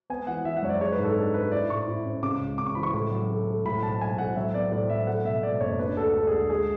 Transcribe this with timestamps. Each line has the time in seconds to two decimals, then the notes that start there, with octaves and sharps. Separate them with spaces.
0.10 B3 G#5
0.27 E3 F#5
0.45 E3 E5
0.57 F#5
0.63 F#2 C#5
0.69 D5
0.81 G#3 C#5
0.92 B4
0.98 G#2
1.04 A4
1.16 D4 A4
1.34 D4 B4
1.52 E4 D5
1.70 A2 C#6
1.88 E4
2.05 C#4
2.23 C#3 D6
2.41 C#2
2.58 C#3 D6
2.66 C#6
2.75 E3 B5
2.83 C#6
2.94 A2
3.11 F#3
3.30 A3
3.47 A3
3.65 A2 B5
3.82 B1 A5
4.01 B1 G#5
4.18 A2 F#5
4.36 F#3 E5
4.54 B3 D5
4.72 A2 D5
4.89 F#3 E5
5.07 A3 F#5
5.25 B2 E5
5.43 B2 D5
5.61 F#1 C#5
5.79 D4 B4
5.97 D2 A4
6.14 D4 A4
6.27 G#4
6.32 D2 A4
6.50 G#3 G#4